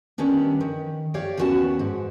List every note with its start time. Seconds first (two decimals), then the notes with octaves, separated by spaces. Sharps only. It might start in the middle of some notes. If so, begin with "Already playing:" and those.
0.18 D#3 G3 B3 C#4 D4
0.61 D#3
1.14 G4 C#5 D5 F5 G5
1.37 D#2 B3 C#4 F#4 F#5 A5
1.79 G#2